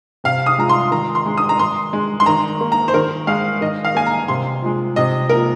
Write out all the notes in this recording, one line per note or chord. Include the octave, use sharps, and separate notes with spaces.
C3 F5
D#6
F3 G#3 A#5
C6
D#3 A#5
C6
G#3
D#6
A#5
D#3 C6
G#3
C6
D#3 A#5
A#3
A#5
C5
D#3 A#4
G#3 F5
D#3 D#5
F5
A#3 G#5
A#5
C3 C6
F3 G#3
C3 D#5
F3 A#3 A#4